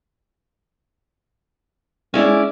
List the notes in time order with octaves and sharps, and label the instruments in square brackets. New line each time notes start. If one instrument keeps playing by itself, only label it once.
[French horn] G#3 [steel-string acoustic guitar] C#4 E4 D5